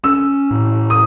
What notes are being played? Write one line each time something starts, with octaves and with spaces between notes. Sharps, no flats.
C#4 E6
A2
D#6